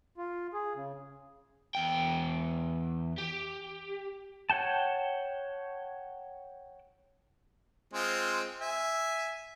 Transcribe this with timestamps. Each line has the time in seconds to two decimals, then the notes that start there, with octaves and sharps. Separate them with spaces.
0.18 F4
0.53 G#4
0.75 C#3
1.75 E2 G5
3.18 G4
4.50 C#5 F#5 G5 A5
7.94 G#3 C4 F4
8.61 E5 G#5